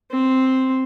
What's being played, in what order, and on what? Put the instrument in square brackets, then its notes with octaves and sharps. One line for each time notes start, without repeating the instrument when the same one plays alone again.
[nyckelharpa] C4